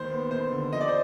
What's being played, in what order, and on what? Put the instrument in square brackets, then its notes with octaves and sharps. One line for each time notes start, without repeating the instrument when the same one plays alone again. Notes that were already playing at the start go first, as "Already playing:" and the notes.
Already playing: [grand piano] D#2 C5
B3
D#2 C5
D3
F3 D#5
D5
C5